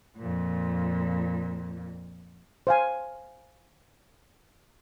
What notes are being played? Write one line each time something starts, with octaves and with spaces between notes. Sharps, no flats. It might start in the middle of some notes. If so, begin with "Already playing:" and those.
F2 A#2
C5 F5 G#5